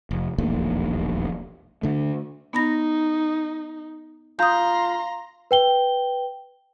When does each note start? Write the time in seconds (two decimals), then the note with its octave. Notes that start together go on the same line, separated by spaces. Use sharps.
0.11 F1
0.38 E1 A#1 D#2 A3
1.83 D3 A3
2.53 B3 D#4 B5 A#6
4.39 F4 A#5 C6 D#6 G6
5.51 B4 G5 G7